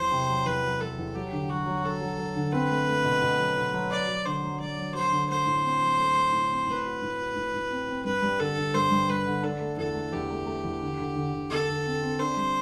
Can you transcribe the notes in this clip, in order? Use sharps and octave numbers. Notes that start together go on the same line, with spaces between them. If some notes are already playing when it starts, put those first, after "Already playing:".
Already playing: E2 F#3 C5
C3
F#3
E2 B4
F#3
F#3 A4
E2
F#3 G4
D3
F#3 F#4
F#3
F#3 A4
F#3
F#3
D3
C4 B4
A3
A3
B2
B2
F#3
B2
F#3
F#3 D5
F#3
D3 C5
F#3
F#3 D5
F#3
F#3 C5
D3
A3 C5
A2
C4
F#3
A3
A3
A2
C4
A2 B4
F#4
A2
F#4
A2
A2
C4
C4
G2 B4
G3
D3 A4
D3
G2 C5
G2
G2 B4
D3
D4 A4
A3
E2 A4
A3
E2 G4
A3
A3
E2
D3
D3
D3
D3
D3 A4
D3
C4
C4
D4 C5
G3